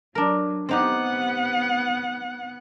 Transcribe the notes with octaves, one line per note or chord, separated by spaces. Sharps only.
F#3 D4 A#4
B3 C4 D#4 G4 F#5